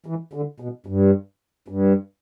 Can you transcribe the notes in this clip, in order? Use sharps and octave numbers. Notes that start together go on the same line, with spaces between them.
E3
D3
B2
G2
G2